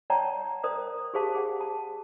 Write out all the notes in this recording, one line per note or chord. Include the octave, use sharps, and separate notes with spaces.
C#5 D5 F#5 G5 A5 A#5
A#4 C5 D5 D#6
G4 G#4 C5 F5 A5
G#4 F#5
A5